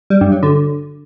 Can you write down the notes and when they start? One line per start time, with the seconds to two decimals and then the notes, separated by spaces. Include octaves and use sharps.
0.10 G3
0.21 G2
0.32 F#3
0.43 D3